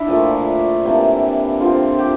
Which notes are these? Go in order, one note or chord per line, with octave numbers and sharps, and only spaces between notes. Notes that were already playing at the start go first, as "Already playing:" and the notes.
Already playing: D4 E4
A#2 F3 A3
C3 E3 A#3 D4
D3 F3 C4 F4
G4